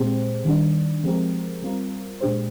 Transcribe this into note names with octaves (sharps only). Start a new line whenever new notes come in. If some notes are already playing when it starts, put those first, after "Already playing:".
Already playing: A#2 G#3 C4 G4 C5
D#3 G3 D4
F3 G#3 C4 G4 A#4
G3 C4 F4 A#4
A#2 G#3 D4 G4 C5